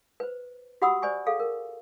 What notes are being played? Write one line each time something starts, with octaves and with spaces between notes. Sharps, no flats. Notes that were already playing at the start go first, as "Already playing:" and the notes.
B4 C5
F#4 G4 F#5 B5 D#6 E6
C5 D5 G#5 C#6
G#4 A4 F5
A#4